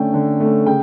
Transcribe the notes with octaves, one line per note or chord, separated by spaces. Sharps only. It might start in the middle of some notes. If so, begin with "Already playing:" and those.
Already playing: D3 A3 C#4 G5
D3
A3 C#4
C#3 G5